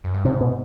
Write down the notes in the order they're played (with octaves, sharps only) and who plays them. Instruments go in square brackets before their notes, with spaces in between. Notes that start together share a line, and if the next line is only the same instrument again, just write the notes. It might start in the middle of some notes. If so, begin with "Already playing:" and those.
[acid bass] F#2
G2
[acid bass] G#2 [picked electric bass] C3
[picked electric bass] B2